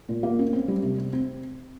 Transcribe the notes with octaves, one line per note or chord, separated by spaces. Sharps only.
A#2
A#3
C#4
C4
G3
C3
C4
C4